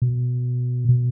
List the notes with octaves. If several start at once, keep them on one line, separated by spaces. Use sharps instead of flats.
B2
B2